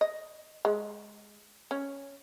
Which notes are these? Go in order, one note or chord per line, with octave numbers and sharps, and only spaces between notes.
D#5
G#3
C#4